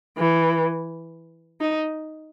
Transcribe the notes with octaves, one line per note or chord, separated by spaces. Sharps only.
E3
D#4